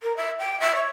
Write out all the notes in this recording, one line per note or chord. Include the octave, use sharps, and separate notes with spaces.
A#4
E5
G5
E5
C#5